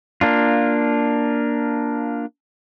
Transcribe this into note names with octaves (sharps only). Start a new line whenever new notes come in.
A#3 D4 F4